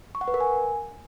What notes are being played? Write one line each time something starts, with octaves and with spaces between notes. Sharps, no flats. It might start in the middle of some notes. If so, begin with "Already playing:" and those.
C#6
F#5
B4
A#4
G#5